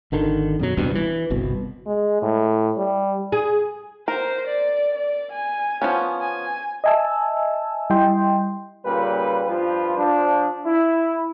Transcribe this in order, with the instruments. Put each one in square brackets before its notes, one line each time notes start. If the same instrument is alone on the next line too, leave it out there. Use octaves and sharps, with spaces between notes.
[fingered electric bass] G#1 D3 D#3
F#2 B2 F#3
D#1 C2 G2 B2
E3
G1 C2 B2
[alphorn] G#3
A2
G3
[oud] G#4
[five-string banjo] A#4 [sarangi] C5
[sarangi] D5
D5
G#5
[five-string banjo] F3 B3 C#4
[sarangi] G#5
[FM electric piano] D#5 E5 G#5 A5 E6
G3 E4 D#5 G5 C6
[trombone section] A#2 C#3 G3 B4
G2 F3 F4 B4
F3 D4
E4